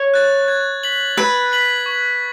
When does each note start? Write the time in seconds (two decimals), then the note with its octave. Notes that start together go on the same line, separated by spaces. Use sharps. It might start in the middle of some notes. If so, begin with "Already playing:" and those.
Already playing: C#5
0.14 F#6 A6
0.48 G#6
0.83 B6 F#7
1.17 B4 G#6
1.52 B6 F#7
1.86 C#6